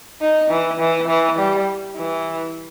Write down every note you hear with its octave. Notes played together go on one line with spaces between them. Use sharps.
D#4
E3
E3
E3
G3
E3